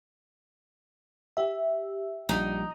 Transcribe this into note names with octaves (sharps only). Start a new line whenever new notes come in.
G4 E5
A#1 G3 D#4